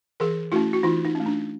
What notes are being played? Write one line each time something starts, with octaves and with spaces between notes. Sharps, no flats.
E3 G#4 A#4
A3 C#4 E4 F#4
F#4
E3 D#4 F4
D#4
A3 C#4
D4